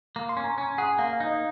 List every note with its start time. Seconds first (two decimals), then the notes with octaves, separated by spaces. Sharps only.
0.16 A#3
0.29 C6
0.37 C#4
0.44 A#5
0.57 C#4 G#5
0.78 G#4 F#5
0.99 A#3 F5
1.13 F5
1.20 D#4
1.27 D#5